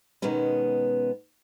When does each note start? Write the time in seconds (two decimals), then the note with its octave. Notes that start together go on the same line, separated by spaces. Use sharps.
0.22 B2 D#3 G#3 B3 C#4